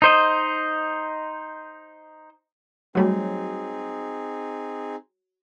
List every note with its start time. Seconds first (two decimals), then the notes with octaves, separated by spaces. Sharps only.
0.02 D#4 C5 D#5
2.95 F#3 G3 A3 C4 D#4 F#4 G#4 C#5